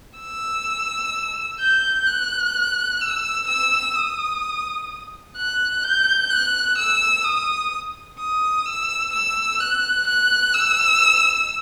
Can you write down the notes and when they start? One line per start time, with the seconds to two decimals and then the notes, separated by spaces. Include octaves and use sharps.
0.18 E6
1.60 G6
2.07 F#6
3.01 E6
3.47 E6
3.95 D#6
5.37 F#6
5.83 G6
6.30 F#6
6.78 E6
7.24 D#6
8.18 D#6
8.66 E6
9.13 E6
9.60 F#6
10.07 F#6
10.54 E6